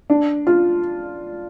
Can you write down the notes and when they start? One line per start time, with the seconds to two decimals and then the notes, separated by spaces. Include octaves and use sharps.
0.10 D4
0.47 F4